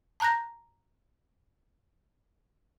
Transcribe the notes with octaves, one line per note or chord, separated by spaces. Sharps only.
A5 A#5 F#6 G6 A#6